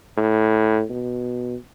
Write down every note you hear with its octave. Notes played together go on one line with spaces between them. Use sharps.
A2
B2